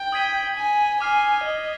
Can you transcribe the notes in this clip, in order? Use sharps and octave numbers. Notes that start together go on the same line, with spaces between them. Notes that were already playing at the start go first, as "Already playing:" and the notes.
Already playing: G5
D#6 G#6 B6 D#7 G7
G#5
G#5 D6 F6 C7
D#5